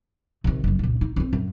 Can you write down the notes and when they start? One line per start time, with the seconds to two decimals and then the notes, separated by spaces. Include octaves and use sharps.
0.44 C3 D#3
0.64 F#1 F#2
0.79 C#2 A#2
1.01 D#4
1.16 C4 D4
1.33 F#2